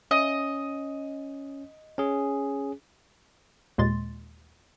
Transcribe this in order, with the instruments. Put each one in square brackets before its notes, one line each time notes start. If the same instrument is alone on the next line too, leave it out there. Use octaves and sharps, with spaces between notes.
[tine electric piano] C#4 [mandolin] D#5
[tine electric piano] C#4 G#4
[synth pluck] D#2 A#2 G#3 C6 A6